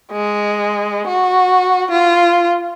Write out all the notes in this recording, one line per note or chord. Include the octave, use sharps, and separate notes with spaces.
G#3
F#4
F4